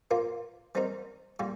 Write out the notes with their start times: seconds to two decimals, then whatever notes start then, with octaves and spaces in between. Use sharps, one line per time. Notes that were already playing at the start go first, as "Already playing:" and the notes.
0.11 A#2 A#3 F4 A#4
0.75 G3 C4 D#4 A#4
1.39 A#2 G3 A#3